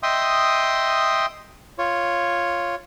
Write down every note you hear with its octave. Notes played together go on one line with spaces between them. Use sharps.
D#5 E5 G5 C6 D#6
F4 C#5